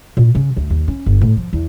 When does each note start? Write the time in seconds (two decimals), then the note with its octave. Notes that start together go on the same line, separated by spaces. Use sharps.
0.17 A#2
0.35 C#3
0.57 D2
0.70 D#2
0.88 C#4
1.06 G1
1.21 A2
1.37 F3
1.53 E2